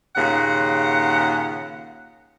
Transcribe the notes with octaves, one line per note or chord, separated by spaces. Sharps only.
D#2 A#2 C#3 F#5